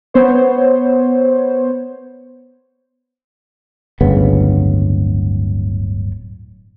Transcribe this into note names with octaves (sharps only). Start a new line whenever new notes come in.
B3 C5 C#5
D1 G1 C#3 B3